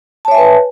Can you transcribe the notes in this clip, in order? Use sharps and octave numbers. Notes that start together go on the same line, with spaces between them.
B4 C#5 E5 G#5 A5